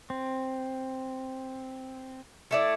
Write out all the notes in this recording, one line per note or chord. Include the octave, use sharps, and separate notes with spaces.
C4
A3 E4 D5